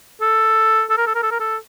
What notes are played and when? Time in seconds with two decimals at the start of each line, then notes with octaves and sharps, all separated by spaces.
0.21 A4
0.90 A4
0.98 A#4
1.07 A4
1.15 A#4
1.23 A4
1.31 A#4
1.39 A4